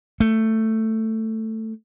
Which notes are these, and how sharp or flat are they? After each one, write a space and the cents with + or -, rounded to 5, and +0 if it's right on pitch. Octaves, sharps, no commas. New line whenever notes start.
A3 +10